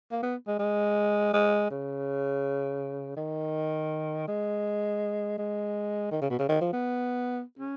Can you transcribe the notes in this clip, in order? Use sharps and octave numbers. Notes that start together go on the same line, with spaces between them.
A#3
B3
G#3
G#3
G#3
C#3
D#3
G#3
G#3
D#3
C#3
B2
C#3
D#3
F3
B3
C#4